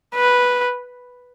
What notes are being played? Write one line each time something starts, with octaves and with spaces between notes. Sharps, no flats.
B4